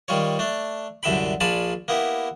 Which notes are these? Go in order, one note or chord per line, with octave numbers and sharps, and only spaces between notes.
D#3 G3 F4 C#5
A3 D4
C2 F#2 D3 E5 G5 B5
A#1 F4 D5 G#5 A5 B5
A#3 B3 E4 G4